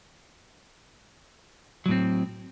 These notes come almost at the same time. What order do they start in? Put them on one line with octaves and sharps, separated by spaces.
F#3 A2 C4